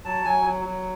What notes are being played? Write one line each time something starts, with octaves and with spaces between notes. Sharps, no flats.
F#3 A5
F#3 G#5
F#3
F#3